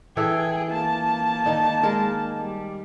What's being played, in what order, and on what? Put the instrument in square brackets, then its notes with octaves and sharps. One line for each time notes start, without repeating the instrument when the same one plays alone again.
[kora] E3 A4 E5 [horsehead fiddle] G#4 G5
[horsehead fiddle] A#3 A5
[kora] D#3 D#4
G#3 D#4 A#4
[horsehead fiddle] G3